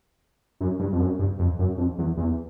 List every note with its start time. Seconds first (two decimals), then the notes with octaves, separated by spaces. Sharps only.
0.61 F#2
0.79 G2
0.93 F2
1.00 F#2
1.19 G2
1.39 F2
1.59 F#2
1.78 F2
1.98 E2
2.17 E2